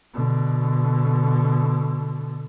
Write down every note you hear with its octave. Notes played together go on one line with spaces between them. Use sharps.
B2 D3